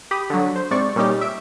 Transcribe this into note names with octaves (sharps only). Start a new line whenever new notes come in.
G4 B5 D#6
D3 F#3
C5
G#2 C3 D5 C#6
A#2 G3 C#4 D#4 G4
E5 D7